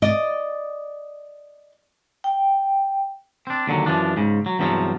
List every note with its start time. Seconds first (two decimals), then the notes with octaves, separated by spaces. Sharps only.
0.02 D5 D#5
2.24 G5
3.47 C4 D4
3.67 D#2 D3 F#3
3.86 F#2 E3 F3 D4
4.17 G#2 C#3
4.46 F#3
4.59 E2 G2 C3 F3 F#3